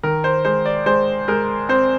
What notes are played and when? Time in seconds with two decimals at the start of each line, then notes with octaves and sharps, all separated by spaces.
0.03 D#3 A#4
0.24 C5
0.45 G#3 C5
0.65 D5
0.86 G#3 C5
1.28 G#3 A#4
1.69 C4 C5